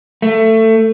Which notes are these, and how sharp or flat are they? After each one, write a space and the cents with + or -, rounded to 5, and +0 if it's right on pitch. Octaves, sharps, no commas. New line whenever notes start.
A3 +20